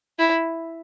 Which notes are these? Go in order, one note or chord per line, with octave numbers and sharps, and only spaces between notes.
E4